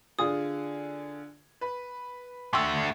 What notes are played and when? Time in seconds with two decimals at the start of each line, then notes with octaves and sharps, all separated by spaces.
0.19 D3 F4 G#4 D#6
1.61 B4
2.53 A3 F#4 G5 C6 E6